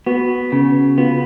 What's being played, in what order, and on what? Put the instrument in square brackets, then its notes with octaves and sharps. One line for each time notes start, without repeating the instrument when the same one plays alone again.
[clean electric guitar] B3 [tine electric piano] F#4
[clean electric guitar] C#3
[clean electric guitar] B3 [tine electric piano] F4